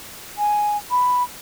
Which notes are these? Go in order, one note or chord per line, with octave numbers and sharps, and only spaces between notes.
G#5
B5